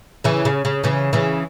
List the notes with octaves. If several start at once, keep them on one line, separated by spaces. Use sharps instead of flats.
C#3 E3
C#3
C#3
C#3 E3
C#3 E3